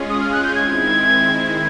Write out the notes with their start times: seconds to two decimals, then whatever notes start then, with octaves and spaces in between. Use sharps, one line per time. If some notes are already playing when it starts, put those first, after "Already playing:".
Already playing: G#3 C#4 F4 G#4
0.10 D#6
0.21 F6
0.32 F#6
0.44 G6
0.55 D#3 G#3 C4 E4 G#6
1.47 G#6